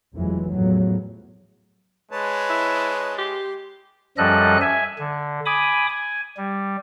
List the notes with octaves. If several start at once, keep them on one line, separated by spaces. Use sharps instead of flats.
F1 F2 E3 F#3 G#3
E2 A2 F3 F#3
G#3 B4 C#5 A5
E4
G4 C6
F#2 F3 G3 A4 D#5 F#6
E5 G#5
D3
G#5 B5 D6 D#6
G#5
G3